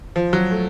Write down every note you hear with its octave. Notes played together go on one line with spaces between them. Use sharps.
F3
F#3
A3